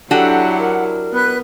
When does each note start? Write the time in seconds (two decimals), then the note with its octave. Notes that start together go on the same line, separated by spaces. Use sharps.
0.11 F#3 D4 E4 F#4 G4 A4 F#5
0.59 A#4
1.13 B3 B4 F#6